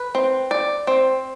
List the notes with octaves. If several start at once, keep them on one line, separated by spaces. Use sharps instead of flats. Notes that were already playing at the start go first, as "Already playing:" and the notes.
Already playing: B4
C4
D5
C4